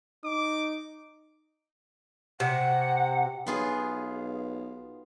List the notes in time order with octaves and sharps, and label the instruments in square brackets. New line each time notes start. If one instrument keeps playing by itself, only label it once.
[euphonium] D#4 [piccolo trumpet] D6
[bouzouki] C3 [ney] F#5
[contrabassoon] B1 [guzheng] B3 F4 G#4